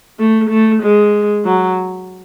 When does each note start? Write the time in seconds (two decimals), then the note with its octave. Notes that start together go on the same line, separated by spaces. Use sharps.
0.19 A3
0.50 A3
0.82 G#3
1.45 F#3